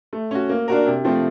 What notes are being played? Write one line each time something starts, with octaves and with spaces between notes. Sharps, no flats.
A3
C#4 F#4
A#3
D4 F#4 A#4
C3
F3 A3 C4